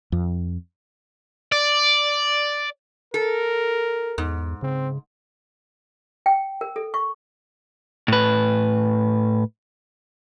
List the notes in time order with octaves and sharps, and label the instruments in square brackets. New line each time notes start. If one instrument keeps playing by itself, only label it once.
[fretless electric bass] F2
[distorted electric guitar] D5
[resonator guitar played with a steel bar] A4 [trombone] A#4
[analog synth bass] E2 [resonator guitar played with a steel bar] G#2
[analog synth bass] C#3 [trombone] C4
[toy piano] G5
A#4
A4
C#6
[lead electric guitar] A2 B4